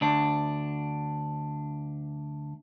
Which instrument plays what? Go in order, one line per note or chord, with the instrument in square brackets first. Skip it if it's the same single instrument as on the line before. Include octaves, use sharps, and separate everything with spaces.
[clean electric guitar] D2 D4